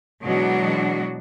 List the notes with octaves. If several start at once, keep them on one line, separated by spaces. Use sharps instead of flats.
B2 E3 F#3 G#3 D4 F#4